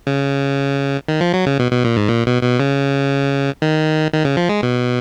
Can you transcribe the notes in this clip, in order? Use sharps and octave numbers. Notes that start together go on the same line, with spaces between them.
C#3
D#3
F3
F#3
C#3
B2
B2
A#2
G#2
A#2
B2
B2
C#3
D#3
D#3
C#3
F3
G#3
B2